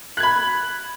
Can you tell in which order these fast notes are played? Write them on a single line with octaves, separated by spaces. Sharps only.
F#6 G#6 B5